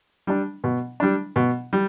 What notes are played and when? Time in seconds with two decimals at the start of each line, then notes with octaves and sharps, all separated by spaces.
0.27 G3 D4
0.64 B2
1.00 G3 D4
1.36 B2
1.73 G3